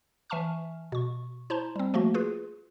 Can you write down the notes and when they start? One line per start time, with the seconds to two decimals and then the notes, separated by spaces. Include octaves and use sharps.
0.30 E3 E5 G#5 A5 C#6 F6
0.92 B2 C#6
1.50 E4 C5 A5 A#5 C6
1.76 G3 C4
1.94 F3 A3 A#3 F#4
2.14 F4 G#4 B4